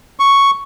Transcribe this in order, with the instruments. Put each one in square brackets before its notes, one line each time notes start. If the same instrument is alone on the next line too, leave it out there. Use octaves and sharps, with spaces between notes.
[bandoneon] C#6